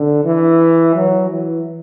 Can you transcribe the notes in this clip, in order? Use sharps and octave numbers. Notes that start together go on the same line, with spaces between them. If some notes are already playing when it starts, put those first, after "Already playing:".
Already playing: D3
E3
F#3
E3